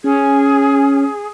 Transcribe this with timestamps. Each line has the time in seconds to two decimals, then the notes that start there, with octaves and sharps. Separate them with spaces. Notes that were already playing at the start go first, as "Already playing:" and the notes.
0.04 C#4 G#4